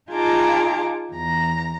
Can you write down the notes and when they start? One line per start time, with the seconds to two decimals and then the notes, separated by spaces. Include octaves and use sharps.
0.11 D#4 F4 G#4 A5 A#5 D6
1.13 E2 A#5